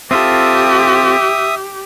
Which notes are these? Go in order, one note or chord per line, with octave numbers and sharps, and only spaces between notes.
C4 F4 G4 A4 E5 D#6